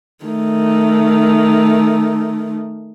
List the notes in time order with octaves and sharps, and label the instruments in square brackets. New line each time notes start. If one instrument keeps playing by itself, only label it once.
[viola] D#3 A3